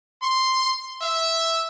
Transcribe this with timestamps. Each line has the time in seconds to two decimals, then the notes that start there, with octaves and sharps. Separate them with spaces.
0.22 C6
1.02 E5